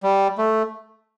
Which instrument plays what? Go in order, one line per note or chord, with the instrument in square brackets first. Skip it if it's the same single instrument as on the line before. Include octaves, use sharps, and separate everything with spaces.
[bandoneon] G3
A3